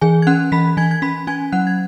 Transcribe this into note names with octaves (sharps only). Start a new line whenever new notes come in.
E3 G#4 G#5
G#6
C#4 F#5 F#6
E3 B5 B6
E3 G#5 G#6
G#6
C#4 B5 B6
C#4 G#5 G#6
F#3 F#5 F#6
G#6